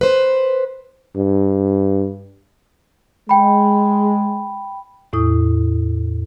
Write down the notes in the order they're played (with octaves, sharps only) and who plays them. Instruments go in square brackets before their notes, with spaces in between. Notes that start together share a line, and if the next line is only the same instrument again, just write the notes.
[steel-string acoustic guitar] B4 C5
[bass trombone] G2
[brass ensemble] G#3 [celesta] G5 B5
[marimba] E2 A2 E4 D#6